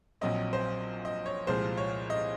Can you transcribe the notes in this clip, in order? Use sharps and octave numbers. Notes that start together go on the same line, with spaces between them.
A#1 A#2 F#3 C4 D#5
C5
D#5
C#5
C2 A#2 F3 G#3 C5
C#5
D#5